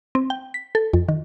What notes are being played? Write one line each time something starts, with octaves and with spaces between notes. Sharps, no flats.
C4
G5
B6
A4
F2
D#3